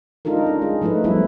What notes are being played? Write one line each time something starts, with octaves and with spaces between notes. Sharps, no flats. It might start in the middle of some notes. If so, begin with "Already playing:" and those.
G#3 D4 D#4 F4 A4 A#4
C#4
G#3 G#4
F3 A3 D#4 E4 B4
F#3 G3 A3 B3 C#4 E4